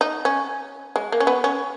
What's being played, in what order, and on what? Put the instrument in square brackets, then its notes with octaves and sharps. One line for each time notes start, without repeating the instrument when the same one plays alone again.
[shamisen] D#4
C#4
G#3
A#3
C#4
B3
C#4